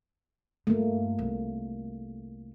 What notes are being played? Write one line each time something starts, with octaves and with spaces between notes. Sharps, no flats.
G2 A3 A#3
C2